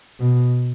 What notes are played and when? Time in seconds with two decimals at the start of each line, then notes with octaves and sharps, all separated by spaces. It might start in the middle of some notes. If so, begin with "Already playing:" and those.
0.20 B2